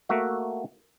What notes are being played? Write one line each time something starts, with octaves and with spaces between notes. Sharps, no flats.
A3 A#3 F#4 E5